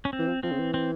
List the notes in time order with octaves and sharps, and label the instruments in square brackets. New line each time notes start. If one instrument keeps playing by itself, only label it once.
[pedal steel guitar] C#4
C4
[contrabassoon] E3
F3
[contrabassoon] F3 [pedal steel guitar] C4
[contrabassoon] C#3
E3
[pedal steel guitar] C4